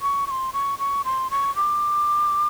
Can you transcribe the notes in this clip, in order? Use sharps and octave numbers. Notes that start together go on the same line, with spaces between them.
C#6
C#6
C6
C#6
C#6
C6
C#6
D6